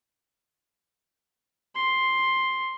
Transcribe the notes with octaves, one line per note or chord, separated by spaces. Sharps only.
C6